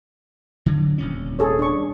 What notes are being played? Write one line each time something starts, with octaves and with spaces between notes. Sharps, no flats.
D3 F#3
D#1 C2 C#4
G#4 A4 C#5
D4 C#6